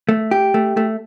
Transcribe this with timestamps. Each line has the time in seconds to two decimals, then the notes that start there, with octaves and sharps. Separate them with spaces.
0.09 A3
0.31 G4
0.54 A3
0.77 A3